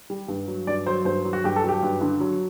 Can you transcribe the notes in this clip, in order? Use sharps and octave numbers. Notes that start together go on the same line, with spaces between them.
G3
G2
F#3
G2 D5
F#3 C5
G2 C5
F#3
F#4
G2 G4
A4
F#3
G4
G2
D3
F#3